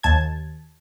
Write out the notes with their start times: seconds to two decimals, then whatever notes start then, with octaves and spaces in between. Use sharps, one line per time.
0.03 D#2 A5 G#6